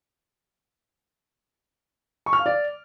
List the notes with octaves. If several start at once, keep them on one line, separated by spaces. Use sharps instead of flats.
C#6
F6
F5
D5